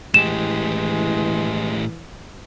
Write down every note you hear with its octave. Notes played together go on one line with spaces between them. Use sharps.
A2 E3 G#3 G4 E7